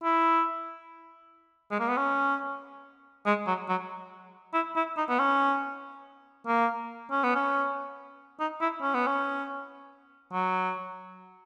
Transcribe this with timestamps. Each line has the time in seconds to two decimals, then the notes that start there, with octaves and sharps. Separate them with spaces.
0.04 E4
1.71 G#3
1.80 A#3
1.89 B3
1.97 C#4
3.26 G#3
3.47 F#3
3.69 F#3
4.54 E4
4.76 E4
4.97 D#4
5.09 B3
5.19 C#4
6.47 A#3
7.11 C#4
7.24 B3
7.35 C#4
8.40 D#4
8.61 E4
8.82 C#4
8.94 B3
9.07 C#4
10.33 F#3